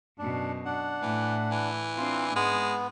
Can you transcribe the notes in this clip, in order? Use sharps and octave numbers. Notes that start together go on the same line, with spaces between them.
F#2 B2 D4
D4 F#5
A2 E3
E3
C4 D4 F4
G#2 G#3 B3